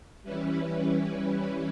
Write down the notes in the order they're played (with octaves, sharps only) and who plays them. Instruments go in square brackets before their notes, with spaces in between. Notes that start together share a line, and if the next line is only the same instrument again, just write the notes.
[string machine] E3 G3 C#4 E4 B4